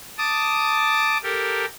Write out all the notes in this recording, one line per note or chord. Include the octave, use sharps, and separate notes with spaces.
A5 D6 D#6
G4 A4 A#4